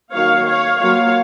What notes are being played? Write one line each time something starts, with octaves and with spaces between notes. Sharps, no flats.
D#3 F#3 A#3 C#5 F5
C#5 F5
F#3 A#3 F4 C#5 F5